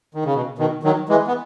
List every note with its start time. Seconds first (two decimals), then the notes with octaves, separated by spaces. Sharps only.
0.15 D#3
0.25 C#3
0.34 B2
0.58 B2 D#3
0.83 D#3 F#3
1.09 E3 G#3
1.27 B3